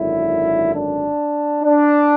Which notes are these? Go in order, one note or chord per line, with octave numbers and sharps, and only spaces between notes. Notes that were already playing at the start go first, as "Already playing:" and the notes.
Already playing: G#1 F#2 D3 E4
D4
D4